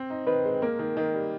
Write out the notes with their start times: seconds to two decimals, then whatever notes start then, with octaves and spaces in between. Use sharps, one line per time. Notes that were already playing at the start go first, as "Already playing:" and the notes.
Already playing: C4 C5
0.10 D#4
0.27 D#3 B4
0.45 G#3
0.62 A#3 A#4
0.79 D#3
0.97 D#3
1.14 G3